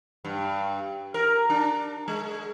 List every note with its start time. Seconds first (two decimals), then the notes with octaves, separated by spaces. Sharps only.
0.25 G2
1.14 A#4
1.50 D4
2.08 G#3